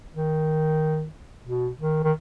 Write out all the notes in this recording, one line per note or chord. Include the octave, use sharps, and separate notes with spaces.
D#3
B2
D#3
D#3